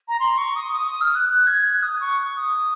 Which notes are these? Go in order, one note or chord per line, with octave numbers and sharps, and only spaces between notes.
A#5
C6
C#6
D#6
D#6
D#6
F6
F#6
F#6
G#6
F#6
D#6
C#6
D#6